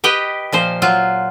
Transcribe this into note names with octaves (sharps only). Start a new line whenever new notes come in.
G4 B4 D#5 G5
A#2 F3 C5
F#3 F4